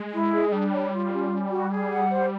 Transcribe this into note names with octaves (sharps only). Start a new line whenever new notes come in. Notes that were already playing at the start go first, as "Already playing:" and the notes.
Already playing: G#3
E4
G#4
G3 D4
C#5
F4
C#4
C#4
F#4
G#4
F#5
C5